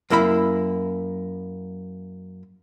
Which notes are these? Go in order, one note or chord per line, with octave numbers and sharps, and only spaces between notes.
F#2 A#3 E4 F4 B5